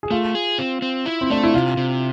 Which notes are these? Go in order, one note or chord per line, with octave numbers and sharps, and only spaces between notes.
G#4
A3 F4
G#4
C4
C4
E4
C4
A3 D4
E4
C3 F4
C3